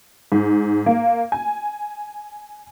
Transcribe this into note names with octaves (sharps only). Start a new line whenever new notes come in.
G#2
A#3
G#5